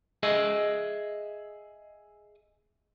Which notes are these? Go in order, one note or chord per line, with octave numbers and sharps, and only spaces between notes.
G#4 D#5 E5